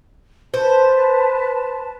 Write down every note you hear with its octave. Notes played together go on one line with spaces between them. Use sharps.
B4 C5 A5